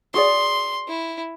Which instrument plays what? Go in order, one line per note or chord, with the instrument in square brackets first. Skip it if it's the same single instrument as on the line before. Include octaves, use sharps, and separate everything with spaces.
[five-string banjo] F#4 G#4 D5 [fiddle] C6
[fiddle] E4